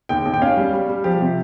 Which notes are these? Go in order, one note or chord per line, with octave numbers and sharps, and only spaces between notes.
D#2 G5
D#2
G5
C#4 F5
G3
G3
G3
F3 G4
C3